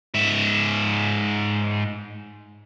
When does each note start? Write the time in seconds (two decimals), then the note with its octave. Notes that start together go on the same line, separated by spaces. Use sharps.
0.15 G#2 E5